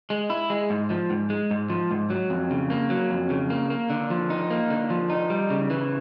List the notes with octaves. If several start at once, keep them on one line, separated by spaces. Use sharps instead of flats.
G#3
E4
G#3
G#2
F3
G#2
G#3
G#2
F3
G#2
F#3
F2
C#3
A#3
F#3
F2
C#3
A#3
A#3
D3
F3
D#4
A#3
D3
F3
D#4
G3
C#3
E3